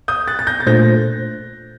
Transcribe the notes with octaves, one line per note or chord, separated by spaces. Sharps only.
D#6 G6
F#6 A6
A6
G6 A#6
A6
A#2 A3 D4 A4 C5 G6 A#6